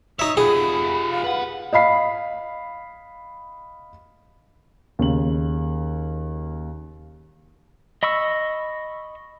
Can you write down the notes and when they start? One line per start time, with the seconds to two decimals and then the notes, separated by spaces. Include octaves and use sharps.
0.19 D#4 C#5 E5 D#6
0.37 F4 G4 G#4 B5
1.10 F5
1.24 B4 F#5
1.73 D#5 F5 B5 C7
4.99 D#2 C#3 F#7
8.03 D#5 B5 C#6 E6